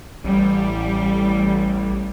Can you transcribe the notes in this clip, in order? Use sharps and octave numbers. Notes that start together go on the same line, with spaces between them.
A1 G3